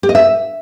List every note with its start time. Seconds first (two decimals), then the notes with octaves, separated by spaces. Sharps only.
0.03 G4
0.09 D#5
0.15 E5